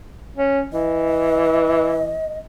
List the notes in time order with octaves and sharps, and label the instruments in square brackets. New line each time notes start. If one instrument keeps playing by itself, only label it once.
[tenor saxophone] C#4
[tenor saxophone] E3 [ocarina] D#5